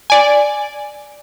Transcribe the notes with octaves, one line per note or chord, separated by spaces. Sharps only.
D5 G#5